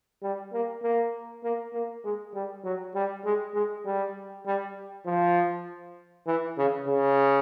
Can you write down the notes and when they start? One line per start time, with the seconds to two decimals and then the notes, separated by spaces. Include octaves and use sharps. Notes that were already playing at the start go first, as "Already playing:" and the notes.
0.23 G3
0.53 A#3
0.83 A#3
1.43 A#3
1.73 A#3
2.04 G#3
2.34 G3
2.64 F#3
2.95 G3
3.25 G#3
3.54 G#3
3.85 G3
4.46 G3
5.06 F3
6.27 E3
6.58 C#3
6.87 C#3